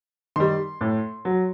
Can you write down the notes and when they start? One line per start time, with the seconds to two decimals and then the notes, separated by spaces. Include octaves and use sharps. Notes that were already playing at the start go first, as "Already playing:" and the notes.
0.36 D#3 G3 C6
0.81 A2
1.25 F#3